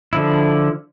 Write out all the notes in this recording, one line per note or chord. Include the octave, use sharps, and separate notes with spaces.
D3 F3 E4